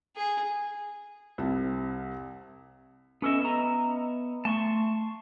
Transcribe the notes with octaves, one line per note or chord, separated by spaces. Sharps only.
G#4
C2 C3 A5
B3 C#4 A4 D#5 E5
D#5 A#5
A3 A5 C6 C#6